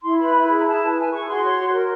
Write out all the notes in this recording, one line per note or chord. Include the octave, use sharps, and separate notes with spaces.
E4 C6
B4 B5
E4
G#4
A#5
E4 A5
B4
E4 G#5
G#4 C#6
F#4 C6
C#5
F#4
A#4